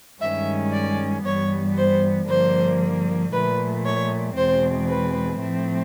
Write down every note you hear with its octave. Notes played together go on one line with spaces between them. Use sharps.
G2 D#3 G#3 C#4 E5
D5
G2 E3 G3 B3 C#5
C5
G2 D3 F3 A#3 C5
A#2 F3 A3 B4
C#5
E2 B2 G#3 C4 C5
B4
A2 F3 A3 C4